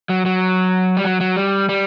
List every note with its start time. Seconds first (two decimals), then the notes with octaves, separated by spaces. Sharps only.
0.09 F#3
0.26 F#3
0.97 G3
1.05 F#3
1.21 F#3
1.36 G3
1.69 G3